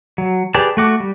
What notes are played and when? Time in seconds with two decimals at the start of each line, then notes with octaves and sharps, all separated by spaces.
0.18 F#3
0.54 G4 G#4 B4 D5 A5
0.77 A3 F#4 D6
1.00 G3